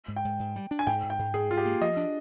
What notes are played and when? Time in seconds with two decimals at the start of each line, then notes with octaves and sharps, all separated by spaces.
0.08 G#2
0.16 G5
0.25 G#2
0.40 G#2
0.56 G3
0.71 D4
0.79 G#5
0.87 G#2 G5
1.03 G#2
1.10 G5
1.19 G#2
1.33 G#2 G#4
1.50 G#2 F4
1.57 G4
1.66 A#3
1.81 F3 D#5
1.97 D4